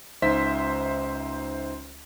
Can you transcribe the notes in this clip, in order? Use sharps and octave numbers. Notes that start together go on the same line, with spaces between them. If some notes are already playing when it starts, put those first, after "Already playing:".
C#2 D#4 C5 E5 C6 B6